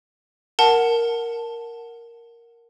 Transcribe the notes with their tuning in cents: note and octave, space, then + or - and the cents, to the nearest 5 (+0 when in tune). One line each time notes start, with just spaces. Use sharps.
A#4 +0 F#5 +0 A5 +0